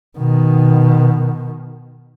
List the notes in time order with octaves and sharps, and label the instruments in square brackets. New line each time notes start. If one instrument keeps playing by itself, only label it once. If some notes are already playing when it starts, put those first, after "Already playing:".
[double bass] B2 D#3